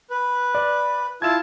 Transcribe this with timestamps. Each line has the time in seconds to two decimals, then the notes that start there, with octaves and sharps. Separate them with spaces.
0.10 B4
0.55 D5
1.22 E4 F4 A5 G#6 E7